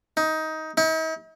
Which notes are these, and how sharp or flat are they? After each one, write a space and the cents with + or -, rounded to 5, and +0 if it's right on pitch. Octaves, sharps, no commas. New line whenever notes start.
D#4 +15
D#4 +45